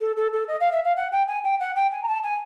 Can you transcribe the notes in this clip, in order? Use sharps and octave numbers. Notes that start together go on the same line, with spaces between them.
A4
A4
A4
D#5
F5
E5
F5
F#5
G5
G#5
G5
F#5
G5
G#5
A#5
A5
G#5